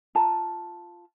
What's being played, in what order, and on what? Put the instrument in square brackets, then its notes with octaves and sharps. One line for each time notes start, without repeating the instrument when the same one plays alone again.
[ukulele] F4 A5 A#5